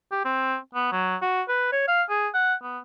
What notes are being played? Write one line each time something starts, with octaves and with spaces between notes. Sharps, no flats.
G4
C4
B3
F#3
F#4
B4
C#5
F5
G#4
F#5
B3